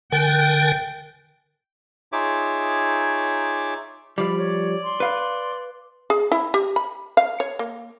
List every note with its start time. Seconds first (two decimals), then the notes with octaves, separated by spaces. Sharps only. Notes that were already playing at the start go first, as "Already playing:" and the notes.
0.12 D3 A#4 G5 G#5
2.12 D#4 F4 G#4 C#5 E5 D6
4.18 F3 G3 D5 B5
4.38 C#5
4.84 C6
5.00 B4 F5
6.10 G#4
6.32 E4
6.54 G4
6.76 B5
7.17 F5
7.40 C#5
7.59 A#3